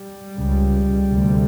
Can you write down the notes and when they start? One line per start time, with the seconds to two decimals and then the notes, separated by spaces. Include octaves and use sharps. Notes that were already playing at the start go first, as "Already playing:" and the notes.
Already playing: G3
0.36 C#2 C#3
1.08 D2 C3